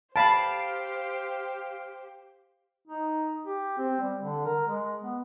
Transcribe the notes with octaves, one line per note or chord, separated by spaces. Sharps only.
G4 C5 F5 A5 B5 C7 D7
D#4
G4
C4
G3
D3
A#4
G#3
B3